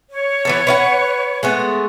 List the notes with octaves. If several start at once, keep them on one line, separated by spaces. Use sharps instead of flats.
C#5
E3 B3 A4
B4 D5 F#5
G#3 A3 B3